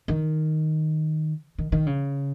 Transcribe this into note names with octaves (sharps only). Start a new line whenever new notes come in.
D#3
D#3
D#3
C#3